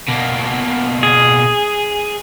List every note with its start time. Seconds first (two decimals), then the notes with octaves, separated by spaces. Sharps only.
0.09 B2 A#3
1.03 G#4